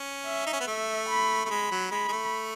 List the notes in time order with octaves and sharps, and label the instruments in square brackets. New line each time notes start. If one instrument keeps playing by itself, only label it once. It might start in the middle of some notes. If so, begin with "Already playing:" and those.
Already playing: [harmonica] C#4
[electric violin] E5
[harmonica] D#4
C#4
B3
[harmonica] A3 [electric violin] E5
[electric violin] B5
[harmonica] A3
[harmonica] G#3 [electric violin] B5
[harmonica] F#3
[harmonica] G#3 [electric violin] B5
[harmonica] G#3
A3